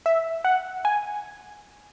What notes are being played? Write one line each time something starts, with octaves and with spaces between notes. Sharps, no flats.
E5
F#5
G#5